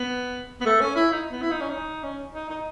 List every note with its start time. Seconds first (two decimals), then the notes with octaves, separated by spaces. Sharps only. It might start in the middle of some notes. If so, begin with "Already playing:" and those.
Already playing: B3
0.61 B3
0.65 A3
0.81 C#4
0.96 E4
1.12 D#4
1.32 B3
1.42 E4
1.51 D#4
1.61 C#4
1.70 D#4
2.04 C#4
2.34 D#4
2.49 D#4